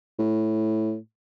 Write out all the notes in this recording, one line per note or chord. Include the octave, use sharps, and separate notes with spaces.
A2